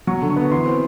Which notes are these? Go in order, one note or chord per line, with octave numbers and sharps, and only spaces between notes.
F#3 C#6
D3
C#6
B3
E3 C6
C4